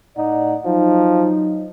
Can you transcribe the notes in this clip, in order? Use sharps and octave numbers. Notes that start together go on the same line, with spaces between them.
A2 D#4 D5 F#5
F3 F#3 D#4